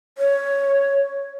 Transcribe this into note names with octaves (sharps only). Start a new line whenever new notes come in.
C#5